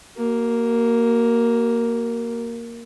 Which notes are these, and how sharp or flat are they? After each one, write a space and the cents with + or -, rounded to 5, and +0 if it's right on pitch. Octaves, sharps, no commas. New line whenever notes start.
A#3 +0 F#4 +40